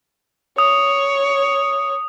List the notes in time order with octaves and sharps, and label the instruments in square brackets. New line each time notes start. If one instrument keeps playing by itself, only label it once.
[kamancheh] C#5 [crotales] D#6